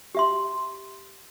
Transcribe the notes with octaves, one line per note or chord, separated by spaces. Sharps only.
G4 E5 C6